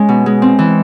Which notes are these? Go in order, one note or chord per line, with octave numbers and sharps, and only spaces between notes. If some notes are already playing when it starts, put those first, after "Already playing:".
Already playing: G#3 C#4
B2
G#3
C4
E3